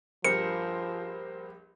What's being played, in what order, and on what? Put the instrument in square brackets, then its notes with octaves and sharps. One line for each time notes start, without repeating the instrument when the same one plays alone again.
[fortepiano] A#1 G2 G4 [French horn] F3 [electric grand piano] A#4 C5 [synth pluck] C#7